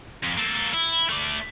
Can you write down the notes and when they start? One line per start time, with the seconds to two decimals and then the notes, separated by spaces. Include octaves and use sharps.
0.24 F2
0.38 A#3 A4
0.74 E4
1.10 A3 D5